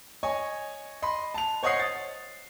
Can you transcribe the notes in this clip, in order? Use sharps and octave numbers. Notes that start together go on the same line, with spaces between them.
C#5 D#5 G#5
D#5 B5 C6
A5 F7
C5 C#5 D#5 F#5 D#6 C7
A6